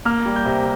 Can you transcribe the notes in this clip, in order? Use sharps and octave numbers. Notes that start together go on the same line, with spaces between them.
A#3 F6
G3
G6
C3